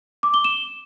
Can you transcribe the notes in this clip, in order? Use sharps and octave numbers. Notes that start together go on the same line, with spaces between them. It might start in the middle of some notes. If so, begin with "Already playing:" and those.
D6
G7
E7